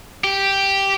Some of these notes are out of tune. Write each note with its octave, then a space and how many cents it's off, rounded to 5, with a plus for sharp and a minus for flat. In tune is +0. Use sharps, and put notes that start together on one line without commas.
G4 +0